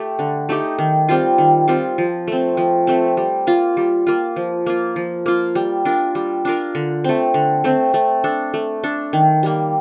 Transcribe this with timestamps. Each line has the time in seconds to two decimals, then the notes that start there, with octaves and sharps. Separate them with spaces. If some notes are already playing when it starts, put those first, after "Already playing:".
Already playing: A3 G4
0.19 D3
0.49 A3 D#4 G4
0.79 D#3
1.09 G3 C4 F4
1.38 D#3
1.68 G3 C4 F4
1.98 F3
2.28 A3 C4
2.57 F3
2.87 A3 C4
3.17 G3
3.47 A#3 F4
3.77 G3
4.07 A#3 F4
4.36 F3
4.66 A#3 F4
4.96 F3
5.26 A#3 F4
5.55 G3
5.85 D4 F4 A#4
6.15 G3
6.45 D4 F4 A#4
6.75 D3
7.04 A3 C4
7.34 D3
7.64 A3 C4
7.94 A3
8.24 D4 A4
8.54 A3
8.84 D4 A4
9.13 D#3
9.43 G3 A#3